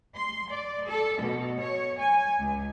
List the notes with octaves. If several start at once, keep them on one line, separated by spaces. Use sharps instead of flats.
C6
D5
A4
B2
C#5
G#5
C#2